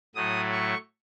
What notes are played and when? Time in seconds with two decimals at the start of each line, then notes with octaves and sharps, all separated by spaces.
0.15 A2 F#3 A3 D#6
0.52 C#6